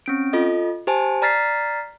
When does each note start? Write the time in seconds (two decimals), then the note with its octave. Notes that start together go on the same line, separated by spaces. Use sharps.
0.06 C4 C#4 D7
0.33 F4 A4 D#5
0.87 G4 C5 G#5 A5
1.22 D5 A#5 F6 A6 B6 C7